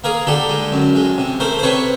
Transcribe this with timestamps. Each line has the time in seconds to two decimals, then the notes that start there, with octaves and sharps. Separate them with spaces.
0.04 A#3 G#4 A#4
0.27 D3 G4 A4
0.49 G#3
0.72 F#2
0.95 G#3
1.18 C3
1.40 A3 A#4 C5
1.59 C5
1.63 C3 B4 C#5